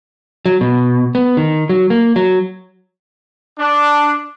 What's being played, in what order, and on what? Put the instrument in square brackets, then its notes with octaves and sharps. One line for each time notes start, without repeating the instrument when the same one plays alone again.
[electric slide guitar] F#3
B2
B3
D#3
F#3
A#3
F#3
[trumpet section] D4